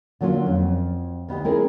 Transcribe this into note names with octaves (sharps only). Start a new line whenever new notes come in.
D3 F#3 A#3 C#4 F4
F2
D2 B3 D#4 G4
G#3 C4 C#4 E4 G#4 A#4